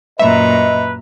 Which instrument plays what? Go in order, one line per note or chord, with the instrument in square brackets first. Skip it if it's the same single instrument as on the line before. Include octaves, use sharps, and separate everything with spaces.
[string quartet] F#2 A#2 A#5 [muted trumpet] B4 [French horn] D#5 [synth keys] E5